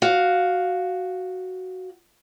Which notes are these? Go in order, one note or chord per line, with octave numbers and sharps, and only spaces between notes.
F#4 F5